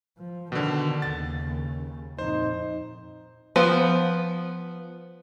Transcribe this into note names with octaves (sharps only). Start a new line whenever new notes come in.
F3
B2 D3 D#3
D#2 C#3 A6
F2 A#2 D#4 C5
F3 B3 C5